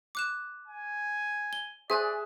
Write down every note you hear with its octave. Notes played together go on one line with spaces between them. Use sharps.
D6 F#6 E7
G#5
G7
G#4 C5 D5 E5 G#5 F#6